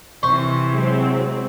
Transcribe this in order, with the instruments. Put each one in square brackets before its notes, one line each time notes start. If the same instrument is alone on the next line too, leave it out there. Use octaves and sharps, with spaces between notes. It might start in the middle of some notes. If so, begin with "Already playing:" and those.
[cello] C3 E3 [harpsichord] C5 C6 C#6
[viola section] F#3 G#3 C4